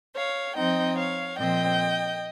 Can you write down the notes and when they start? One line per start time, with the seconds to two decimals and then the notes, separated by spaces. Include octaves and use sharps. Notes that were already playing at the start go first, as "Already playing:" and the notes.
0.15 C#5 F5
0.56 F3 C4 D#4 D#5 G5
0.97 C#5 F5
1.38 A#2 F3 C4 D#5 G5